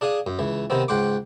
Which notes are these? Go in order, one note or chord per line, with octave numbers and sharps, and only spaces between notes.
D4 G#4 F5 D#6
F#2
C#2 E3
C3 D#3 B3 C4
C#2 G#2 F#5 G5 C6 D6